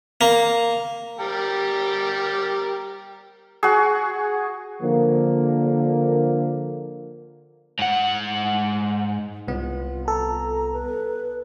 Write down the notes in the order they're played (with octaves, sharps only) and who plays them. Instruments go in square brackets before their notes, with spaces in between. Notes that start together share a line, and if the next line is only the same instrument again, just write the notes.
[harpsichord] A#3
[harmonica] G3 G4 A#4
[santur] F#4 G#4
[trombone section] D3 F3 A#3
[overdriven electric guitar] G#2 F#5
[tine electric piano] C2 B3 [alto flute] F4
[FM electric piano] A4 [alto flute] A#5
[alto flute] B4